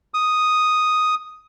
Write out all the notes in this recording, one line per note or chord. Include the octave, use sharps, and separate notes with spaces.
D#6